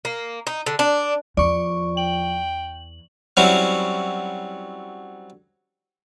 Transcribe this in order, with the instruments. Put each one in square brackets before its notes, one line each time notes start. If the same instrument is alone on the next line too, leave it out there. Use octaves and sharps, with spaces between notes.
[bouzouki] A#3
D#4
D3
D4
[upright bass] E2 [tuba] F3 [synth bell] D5 C#6
[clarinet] G5 [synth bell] F#7
[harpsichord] F#3 G3 C4 C#4 E4